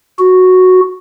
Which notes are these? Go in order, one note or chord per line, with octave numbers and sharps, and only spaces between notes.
F#4